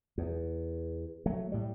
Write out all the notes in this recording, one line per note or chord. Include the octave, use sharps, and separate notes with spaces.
E2
F#3 A3
A2 G3